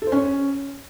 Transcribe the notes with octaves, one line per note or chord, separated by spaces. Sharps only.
A4
C5
C#4